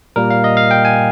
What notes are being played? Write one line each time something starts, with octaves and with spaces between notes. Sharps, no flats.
A#2 G3 A#3 A#4
F5
D#5
F5
G5
G#5